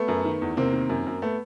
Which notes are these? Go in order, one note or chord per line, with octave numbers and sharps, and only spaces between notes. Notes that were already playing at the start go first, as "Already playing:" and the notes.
Already playing: A3 B3
F#2
D#3
E2
C3 A#3 C4
D#3
F#2
F#2
A3 B3